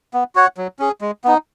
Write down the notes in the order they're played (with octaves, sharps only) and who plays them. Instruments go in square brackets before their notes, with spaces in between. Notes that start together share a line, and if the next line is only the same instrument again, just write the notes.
[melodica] B3
F#4 C#5 F#5
F#3
C#4 G#4
G#3
B3 D#4